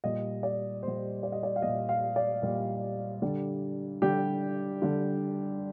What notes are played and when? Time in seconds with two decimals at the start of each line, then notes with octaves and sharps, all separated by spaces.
0.04 A#2 G3 D#5
0.43 D5
0.83 A#2 G3 C5
1.23 D5
1.32 D#5
1.43 D5
1.56 F5
1.62 A#2 G3 D#5
1.89 F5
2.16 D5
2.42 A#2 G3
3.22 D3 G3
4.02 D3 G3 G4
4.82 D3 G3